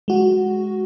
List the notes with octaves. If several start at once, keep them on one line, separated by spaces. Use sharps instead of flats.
G#3 F#4